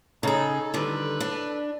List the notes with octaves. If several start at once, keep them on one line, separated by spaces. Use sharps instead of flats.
C#3 D#4 G#4 A4
D3 D#3 G3 A4 B4
D4